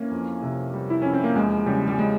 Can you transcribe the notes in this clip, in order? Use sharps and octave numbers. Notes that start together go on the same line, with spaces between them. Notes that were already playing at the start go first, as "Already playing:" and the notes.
Already playing: E3 A#3 C#4
F2
C3
G3
E4
F2 C#4
C4
A#3
E2 G#3
C#3 G3
G3
G3 G#3